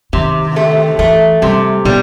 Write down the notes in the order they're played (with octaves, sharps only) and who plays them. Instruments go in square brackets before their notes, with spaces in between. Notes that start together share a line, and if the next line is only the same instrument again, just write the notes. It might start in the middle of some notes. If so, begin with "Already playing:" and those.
[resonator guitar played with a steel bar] C3 [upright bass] D#3
[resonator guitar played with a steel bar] A3
[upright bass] E3 [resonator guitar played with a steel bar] A3
[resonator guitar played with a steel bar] C3 [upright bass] G3
[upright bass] B2 [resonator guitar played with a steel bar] G3